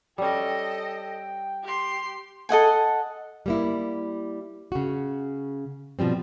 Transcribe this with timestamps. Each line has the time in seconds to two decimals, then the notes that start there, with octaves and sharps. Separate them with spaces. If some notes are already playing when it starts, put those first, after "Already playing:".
0.18 G3 C#4 A4 D#5 G5
1.63 G4 C6
2.49 A4 D#5 F#5 G#5
3.46 G3 A#3 E4
4.72 C#3 F#4
5.99 B2 F3 G3 C4